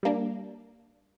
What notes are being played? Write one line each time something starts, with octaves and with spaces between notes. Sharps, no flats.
G3 A#3 D4